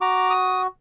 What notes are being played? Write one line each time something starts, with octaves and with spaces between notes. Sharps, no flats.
F#4 A#5 D6
D#6